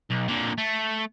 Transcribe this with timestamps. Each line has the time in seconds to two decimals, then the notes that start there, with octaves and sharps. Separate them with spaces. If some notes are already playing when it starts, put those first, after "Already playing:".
0.10 B1
0.28 A#2 D3
0.58 A3